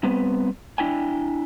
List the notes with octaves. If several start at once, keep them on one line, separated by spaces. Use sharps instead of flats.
G3 B3 C4 B4
D4 E4 G5 G#5